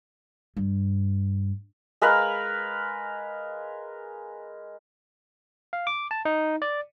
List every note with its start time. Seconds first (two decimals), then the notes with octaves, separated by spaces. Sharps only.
0.57 G2
2.02 G#3 A#4 B4 F5
5.73 F5
5.87 D6
6.11 A5
6.25 D#4
6.62 D5